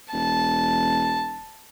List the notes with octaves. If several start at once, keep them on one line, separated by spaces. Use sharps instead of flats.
E1 A5